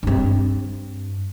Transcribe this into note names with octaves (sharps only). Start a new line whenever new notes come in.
G2 C4